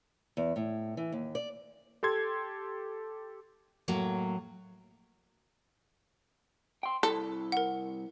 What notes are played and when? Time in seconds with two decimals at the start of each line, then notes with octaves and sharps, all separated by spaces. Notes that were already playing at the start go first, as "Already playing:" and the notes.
0.37 E2
0.56 A2
0.97 E3
1.12 D#2
1.35 D5
2.03 G4 A4 C6 G#6
3.88 A2 F#3 A#3
6.83 G5 C6
7.03 C2 E4 A4
7.52 A#4 F#5